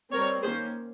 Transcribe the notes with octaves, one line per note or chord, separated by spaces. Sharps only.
G3 C4 A#4 C#5
D#3 A#3 C#4 G#4 C5